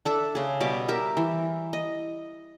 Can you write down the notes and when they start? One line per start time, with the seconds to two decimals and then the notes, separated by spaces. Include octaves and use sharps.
0.05 D4 A4 E5
0.35 C#3 G#4
0.60 B2 G3 D6
0.88 G4 A#4 E5
1.17 E3
1.73 D#5